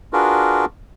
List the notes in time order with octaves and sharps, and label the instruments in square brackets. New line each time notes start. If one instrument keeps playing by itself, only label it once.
[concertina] D4 F4 F#4 G#4 A#4 B4